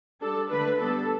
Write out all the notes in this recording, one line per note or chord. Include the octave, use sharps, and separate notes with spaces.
G3 D4 A4
D3 A3 D4 B4
G3 B3 D4 A4